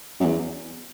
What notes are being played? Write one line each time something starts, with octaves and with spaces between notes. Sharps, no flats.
F#2
E2